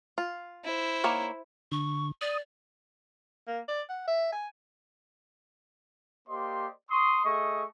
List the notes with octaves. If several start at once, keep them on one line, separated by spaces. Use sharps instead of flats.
F4
E4 C5
D#3 A#3 C#5
D3 C#6
D5 D#6
A#3
D5
F#5
E5
G#5
A#3 G4 C5 D5 D#5 C6
C6 C#6 D#6
A3 G#4 D#5 C#6